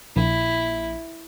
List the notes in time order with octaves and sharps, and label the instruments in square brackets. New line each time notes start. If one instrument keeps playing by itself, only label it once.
[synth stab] A#1 [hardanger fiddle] E4